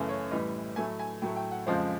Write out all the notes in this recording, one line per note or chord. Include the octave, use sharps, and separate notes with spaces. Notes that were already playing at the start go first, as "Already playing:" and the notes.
Already playing: F#2 C#3 E3 A3
C#5
A2 E3 G3 D#5
A2 F#3 A3 G#5
G#5
A2 F#3 A3 G5
G5
F#5
F2 C#3 F3 G#3 C5